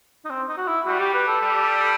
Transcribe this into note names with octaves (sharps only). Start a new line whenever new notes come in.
D#4
C4
D#4
F#4
E4
G3 F#4
G4
B4
A4
G3